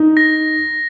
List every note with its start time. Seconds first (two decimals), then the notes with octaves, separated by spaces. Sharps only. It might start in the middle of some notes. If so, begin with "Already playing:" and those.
Already playing: D#4
0.17 A#6